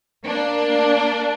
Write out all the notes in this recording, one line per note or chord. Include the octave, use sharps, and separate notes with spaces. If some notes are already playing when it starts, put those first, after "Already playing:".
A#3 D4